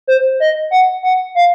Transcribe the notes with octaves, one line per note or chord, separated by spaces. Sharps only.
C5
D#5
F#5
F#5
F5